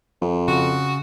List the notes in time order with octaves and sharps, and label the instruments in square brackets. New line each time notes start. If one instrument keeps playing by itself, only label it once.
[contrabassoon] F2
[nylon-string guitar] C#3 [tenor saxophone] F#4